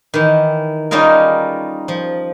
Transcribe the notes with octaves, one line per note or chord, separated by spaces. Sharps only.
D#3 E3
G3 C#4 D#4 F4 G#4 A#4
F3